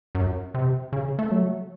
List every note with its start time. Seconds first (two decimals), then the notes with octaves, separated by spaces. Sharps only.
0.15 F#2
0.54 C3
0.93 C#3
1.19 A3
1.31 F#3